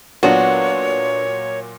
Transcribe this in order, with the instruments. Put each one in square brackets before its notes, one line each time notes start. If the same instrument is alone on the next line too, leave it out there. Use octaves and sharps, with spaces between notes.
[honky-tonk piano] A#2 F#3 F4 [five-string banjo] B3 D4 [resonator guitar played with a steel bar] F#4 [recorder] C#5